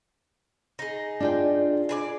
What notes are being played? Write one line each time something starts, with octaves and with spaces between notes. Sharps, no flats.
D#4 G#4
D4 F4 G5
G#4 B4 D5